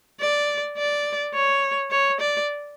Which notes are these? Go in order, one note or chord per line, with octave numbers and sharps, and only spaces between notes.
D5
D5
C#5
C#5
D5